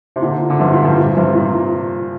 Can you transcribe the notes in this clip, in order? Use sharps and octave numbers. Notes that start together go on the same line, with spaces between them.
C3
A#2 D3
D3
G2 C3
A#2
G2
A#2
G2 C3
A#2